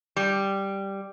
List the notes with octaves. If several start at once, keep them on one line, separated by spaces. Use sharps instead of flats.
G3